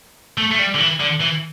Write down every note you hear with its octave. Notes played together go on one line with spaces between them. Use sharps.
A3
A3
G3
D3
E3
D3
E3